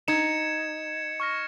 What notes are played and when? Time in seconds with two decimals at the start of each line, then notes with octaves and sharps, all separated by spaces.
0.08 D#4 G#6 C#7 E7
1.20 C#6 F6 A#6